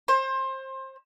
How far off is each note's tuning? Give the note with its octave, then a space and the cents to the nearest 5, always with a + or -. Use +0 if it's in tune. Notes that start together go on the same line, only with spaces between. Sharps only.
C5 +25